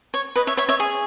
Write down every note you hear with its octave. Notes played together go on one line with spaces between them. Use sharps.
C#5
B4 D#5
C#5 E5
C#5 E5
C#5 E5
G#4